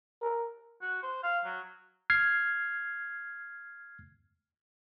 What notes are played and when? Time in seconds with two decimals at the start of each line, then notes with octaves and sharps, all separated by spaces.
0.22 A#4
0.82 F#4
1.03 C5
1.23 F5
1.45 F#3
2.10 F6 G#6 C7